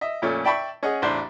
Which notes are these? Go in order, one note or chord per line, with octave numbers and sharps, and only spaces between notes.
D#5 E5
F2 A#2 A3 C#4
D5 E5 G5 A5 B5 C#6
C#4 G#4 D#5 F#5
A1 E2 D4 C5 C6